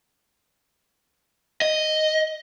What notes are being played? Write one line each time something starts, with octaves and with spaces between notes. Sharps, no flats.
D#5